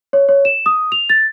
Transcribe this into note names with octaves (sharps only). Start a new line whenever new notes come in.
C#5
C#5
E7
D#6
F7
A6